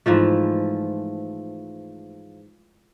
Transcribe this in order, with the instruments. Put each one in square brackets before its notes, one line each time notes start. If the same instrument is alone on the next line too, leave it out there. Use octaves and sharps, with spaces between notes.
[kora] G#2 E3 F3 A3